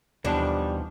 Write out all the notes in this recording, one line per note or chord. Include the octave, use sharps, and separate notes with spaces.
D#2 B2 E3 F3 G3 D4